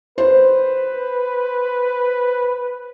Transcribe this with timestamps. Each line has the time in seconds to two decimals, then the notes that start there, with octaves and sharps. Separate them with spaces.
0.18 B4 C5